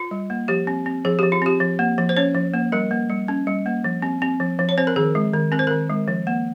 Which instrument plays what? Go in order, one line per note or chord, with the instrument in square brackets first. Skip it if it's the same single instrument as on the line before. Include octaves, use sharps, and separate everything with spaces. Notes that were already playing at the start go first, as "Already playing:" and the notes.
Already playing: [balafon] F4
G3
A#3
F3 G4
C4
C4
F3 G#4
F3 G4
F4
C4 G4
F3
A#3
F3
C5
C#4 C#5
F3
A#3
G3 A#4
A#3
G3
C#4
G3
A#3
F3
C4
C4
F3
F3
C#5
C4 C5
A#4
D#3 G#4
G#3
D#3
C4 A#4
C5
D#3 A#4
G#3
F3
A#3